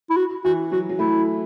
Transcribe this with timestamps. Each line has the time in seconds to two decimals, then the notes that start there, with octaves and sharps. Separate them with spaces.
0.10 E4
0.16 F#4
0.44 E3 F#4
0.72 F#3 F#4
0.89 F#3
0.99 A3 E4